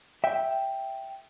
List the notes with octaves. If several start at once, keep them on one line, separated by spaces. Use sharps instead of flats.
E5 G5